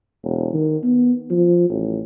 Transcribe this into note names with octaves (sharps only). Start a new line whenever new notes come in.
E1
D#3
B3
F3
A1